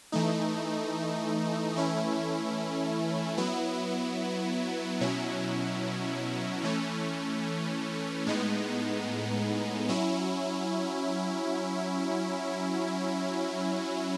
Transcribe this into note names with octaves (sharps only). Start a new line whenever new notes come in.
E3 A3 D#4
E3 A3 C#4 E4
F#3 B3 E4
B2 F#3 C#4 E4
E3 A3 C#4
A2 G#3 B3 D#4
F#3 C#4 E4